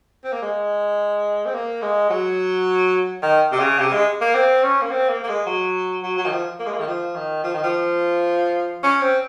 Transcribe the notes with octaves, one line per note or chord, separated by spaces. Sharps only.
C4
A#3
G#3
C4
A#3
G#3
F#3
D#3
C3
C#3
C3
G#3
A#3
C4
C#4
A#3
C4
A#3
A#3
G#3
F#3
F#3
F#3
D#3
F3
A#3
G#3
A#3
D#3
F3
D#3
F3
D#3
F3
C#4
C4